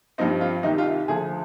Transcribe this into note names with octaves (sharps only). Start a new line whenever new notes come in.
G2 F3 C4 D#4
F4
C2 C3 D#3 D#4
F4
D2 D3 F3 G#4